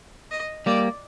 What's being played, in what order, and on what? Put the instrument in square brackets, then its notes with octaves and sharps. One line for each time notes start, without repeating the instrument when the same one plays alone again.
[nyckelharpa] D#5
[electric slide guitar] G3 A#3 [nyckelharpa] D5